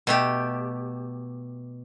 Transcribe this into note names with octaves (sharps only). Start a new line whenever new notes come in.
B2 A3 G4